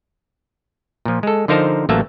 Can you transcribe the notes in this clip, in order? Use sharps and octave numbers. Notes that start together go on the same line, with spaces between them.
A#2 F3
G#3 A4
D3 F3 D#4 A#4 C5 A5
A1 F#3 A3 A#3 E5 A5